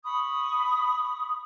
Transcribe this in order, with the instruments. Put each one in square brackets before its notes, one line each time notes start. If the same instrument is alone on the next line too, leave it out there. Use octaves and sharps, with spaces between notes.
[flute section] B5 C#6 D#6